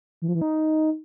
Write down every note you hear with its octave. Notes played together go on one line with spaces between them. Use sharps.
E3
F3
E3
D#4